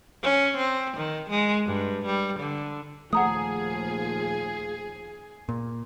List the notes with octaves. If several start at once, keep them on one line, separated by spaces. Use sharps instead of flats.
C#4
C4
D#3
G#3
G2
G3
D3
D#2 A#2 F3 A3 G#4 F#5 A#5 D#6
A#2